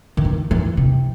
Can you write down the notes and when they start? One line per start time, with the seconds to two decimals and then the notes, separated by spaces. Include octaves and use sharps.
0.17 D#3
0.25 E3
0.51 E3
0.77 C3